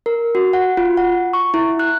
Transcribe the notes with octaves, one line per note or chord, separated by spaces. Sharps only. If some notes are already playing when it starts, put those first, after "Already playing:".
A#4
F#4
F#5
F4
F#5
C#6
E4
F#6